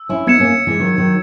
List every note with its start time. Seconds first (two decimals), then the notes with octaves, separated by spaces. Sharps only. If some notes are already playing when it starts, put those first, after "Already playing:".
Already playing: E6
0.09 C#4 E4
0.27 B3 D#4 G#6 C#7 E7
0.40 A#3 C#4
0.67 E3 G#3
0.80 D#3 F#3
0.98 D#3 F#3